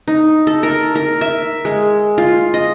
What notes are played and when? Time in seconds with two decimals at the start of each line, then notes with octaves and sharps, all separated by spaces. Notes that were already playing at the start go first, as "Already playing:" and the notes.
0.08 D#4
0.47 A4
0.63 A#4
0.95 A#4
1.21 E5
1.65 G#3
2.18 F4
2.54 D#5